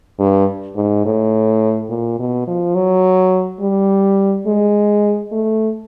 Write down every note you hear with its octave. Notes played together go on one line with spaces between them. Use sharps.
G2
G#2
A2
A#2
B2
F3
F#3
G3
G#3
A3